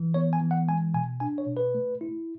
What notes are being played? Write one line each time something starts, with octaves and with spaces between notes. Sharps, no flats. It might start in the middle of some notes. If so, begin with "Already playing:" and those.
Already playing: E3
B3 C#5
G#5
E3
F#5
G#3 G#5
B2 G#5
D4 G#5
C#5
B2
B4
A3
E4